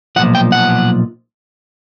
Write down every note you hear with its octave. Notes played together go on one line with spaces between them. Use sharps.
B1 A#2 F3 F#5
G5
F#5